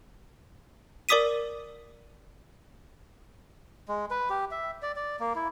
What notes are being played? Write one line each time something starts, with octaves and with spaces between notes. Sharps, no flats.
A#4 D5 D6 D#6 B6 D#7
G#3
B4
G4
E5
D5
D5
A#3
E4